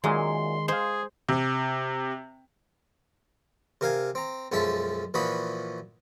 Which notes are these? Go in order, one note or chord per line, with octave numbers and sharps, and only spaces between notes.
F#2 A#2 D#3 G#3 C6
G#4 C5 D#5 F5
C3
C3 A#4 F5 G#5
C4 A#5
B1 F#2 F3 G#3 E5 A5
A#2 E3 F3 F#4 B5 D#6